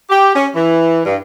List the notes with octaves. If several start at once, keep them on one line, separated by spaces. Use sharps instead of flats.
G4
C#4
E3
G2